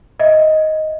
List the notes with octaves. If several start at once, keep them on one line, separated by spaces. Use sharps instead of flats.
D#5 E5